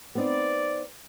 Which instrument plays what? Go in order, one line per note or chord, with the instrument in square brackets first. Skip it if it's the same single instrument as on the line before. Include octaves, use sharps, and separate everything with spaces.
[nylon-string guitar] B3 C4 D#4 [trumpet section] D5